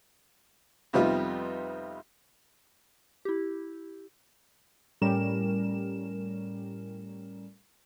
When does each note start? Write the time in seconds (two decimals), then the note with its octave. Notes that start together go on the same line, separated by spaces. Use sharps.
0.93 F2 C3 G3 B3 D#4 F4
3.25 E4 G4
5.01 A2 G3 C#4 A#4 E7